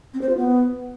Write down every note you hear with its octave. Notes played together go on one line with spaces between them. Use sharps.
C4
C5
F4
B3